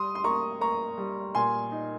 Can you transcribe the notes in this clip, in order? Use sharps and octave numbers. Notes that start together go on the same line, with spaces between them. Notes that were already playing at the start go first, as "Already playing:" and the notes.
Already playing: G3 C6 D#6
C6
A#3 A#5 C#6
A#3 A#5 C#6
G3
A#2 G#5 C6
D#4